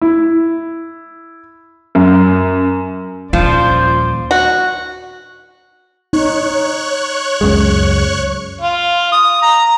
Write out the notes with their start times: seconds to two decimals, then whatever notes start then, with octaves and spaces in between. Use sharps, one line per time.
0.01 E4
1.95 F#2
3.33 D#2 A#2 F3 G3 C#4 C5 D5
4.31 F#4
6.13 D#4 C#5 C#6 F#6
7.41 C#2 F#2 G#3
8.61 F4
9.12 D#6
9.42 A#5